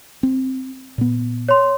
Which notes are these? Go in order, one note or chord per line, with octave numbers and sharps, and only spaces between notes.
C4
A#2 B3
C#5 C6